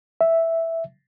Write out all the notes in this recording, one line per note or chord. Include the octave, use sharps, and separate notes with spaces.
E5